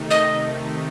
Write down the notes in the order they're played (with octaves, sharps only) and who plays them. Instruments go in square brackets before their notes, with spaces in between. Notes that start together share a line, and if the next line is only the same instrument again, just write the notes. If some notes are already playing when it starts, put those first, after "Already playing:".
Already playing: [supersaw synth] C3 D#3 A3 D#4
[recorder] D#5